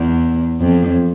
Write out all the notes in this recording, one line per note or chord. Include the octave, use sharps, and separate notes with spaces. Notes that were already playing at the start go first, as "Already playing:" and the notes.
Already playing: E2
F2